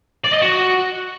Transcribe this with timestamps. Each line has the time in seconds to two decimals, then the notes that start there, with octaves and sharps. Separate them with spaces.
0.24 D5
0.33 D#5
0.42 F#4